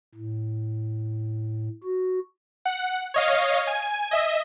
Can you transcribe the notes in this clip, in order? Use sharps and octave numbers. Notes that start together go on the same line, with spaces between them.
A2
F#4
F#5
C#5 D#5 F5
G#5
D#5 E5